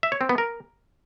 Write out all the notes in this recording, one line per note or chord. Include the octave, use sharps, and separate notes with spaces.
E5
C#5
C4
B3
A#4